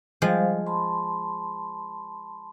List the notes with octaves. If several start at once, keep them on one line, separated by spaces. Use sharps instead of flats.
F3 G3 G#3 C5 F5
A5 B5 C6